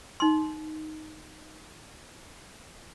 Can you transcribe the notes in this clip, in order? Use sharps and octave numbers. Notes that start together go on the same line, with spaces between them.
D#4 C6